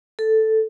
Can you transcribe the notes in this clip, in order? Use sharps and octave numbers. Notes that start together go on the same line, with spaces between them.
A4